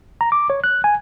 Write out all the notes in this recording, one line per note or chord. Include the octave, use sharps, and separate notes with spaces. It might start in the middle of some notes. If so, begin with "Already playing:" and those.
A#5
D6
C#5
F#6
G#5